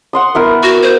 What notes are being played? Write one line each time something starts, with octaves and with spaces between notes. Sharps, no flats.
F#5 C6 D#6
B3 E4 A#4
F#4
C5